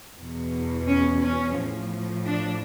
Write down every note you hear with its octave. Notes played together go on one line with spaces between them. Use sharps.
E2 B2
C#4
C#4
A2 F3
D4